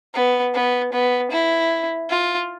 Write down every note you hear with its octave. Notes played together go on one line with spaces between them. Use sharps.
B3
B3
B3
E4
F4